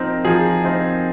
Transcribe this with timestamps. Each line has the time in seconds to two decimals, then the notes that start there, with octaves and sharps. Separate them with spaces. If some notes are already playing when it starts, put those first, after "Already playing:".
Already playing: F3 C4 D#4 A#4
0.25 F3 G#4
0.64 C4 D#4